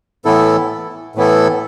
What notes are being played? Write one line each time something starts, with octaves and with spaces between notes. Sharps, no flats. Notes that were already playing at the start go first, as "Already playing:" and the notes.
A2 E3 B3 E4 A4
A2 E3 B3 E4 A4